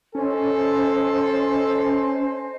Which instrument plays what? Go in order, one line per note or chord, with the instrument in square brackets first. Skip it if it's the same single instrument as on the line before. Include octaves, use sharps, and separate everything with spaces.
[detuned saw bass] C#4 [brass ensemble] A4 [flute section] C5 D#5 G#5